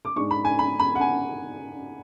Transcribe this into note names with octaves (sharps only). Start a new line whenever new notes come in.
D6
G#2 G#3 D4 C#6
B5
G#5
B5
B5
F#5
G#5